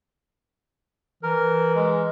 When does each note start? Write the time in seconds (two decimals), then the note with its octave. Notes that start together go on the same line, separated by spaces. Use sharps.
1.23 E3 A#4
1.76 G#3